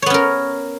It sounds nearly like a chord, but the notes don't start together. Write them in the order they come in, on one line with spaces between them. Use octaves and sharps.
C#5 B3 C#4 A#4